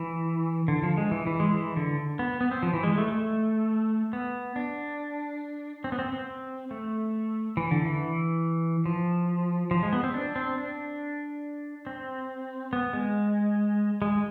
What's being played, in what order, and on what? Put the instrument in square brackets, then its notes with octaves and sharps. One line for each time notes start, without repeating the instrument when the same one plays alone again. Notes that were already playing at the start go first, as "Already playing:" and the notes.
Already playing: [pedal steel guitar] E3
D3
F3
G#3
E3
E3
G#3
E3
D3
B3
B3
C4
F3
E3
G#3
A3
A3
B3
D4
C4
B3
C4
C4
A3
E3
D3
E3
F3
F3
G#3
B3
C4
D4
C4
D4
C4
B3
G#3
G#3